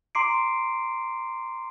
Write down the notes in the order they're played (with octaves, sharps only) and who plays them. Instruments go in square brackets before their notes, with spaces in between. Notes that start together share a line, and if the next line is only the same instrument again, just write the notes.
[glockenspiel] A#5 C6 D6 C7 D7